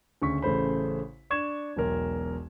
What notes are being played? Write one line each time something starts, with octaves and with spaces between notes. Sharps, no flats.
D2 C#3 C#6 B6
A1 C#3 A3 C5 B5
D4 C#6 G#6 E7
E1 B1 A#4